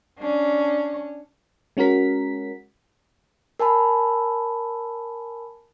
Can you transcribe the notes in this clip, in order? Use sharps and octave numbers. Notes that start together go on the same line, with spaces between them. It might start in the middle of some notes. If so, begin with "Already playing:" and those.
C#4 D4
G#3 C#4 F#4 A#4 B6
A#4 G#5 A5 B5